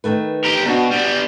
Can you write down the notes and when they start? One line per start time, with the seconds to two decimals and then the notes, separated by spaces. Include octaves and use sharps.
0.04 D#3 A3 B4
0.44 G4 A#4
0.65 B2 C4 D4 F#4
0.91 G3 B3